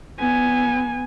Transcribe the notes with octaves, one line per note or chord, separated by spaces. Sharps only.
B3 G#5